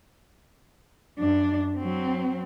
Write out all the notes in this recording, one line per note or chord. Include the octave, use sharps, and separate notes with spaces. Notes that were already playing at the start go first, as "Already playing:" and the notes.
F#2 D4
F#3 C4